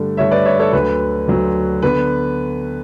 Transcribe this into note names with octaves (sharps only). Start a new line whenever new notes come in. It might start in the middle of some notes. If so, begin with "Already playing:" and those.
Already playing: G2 D3 A3
G2 D3 A3 C#5 E5
B4 D5
C#5 E5
A4 C#5
D2 D3 F#3 B4
D2 D3 F#3
D3 B3 B4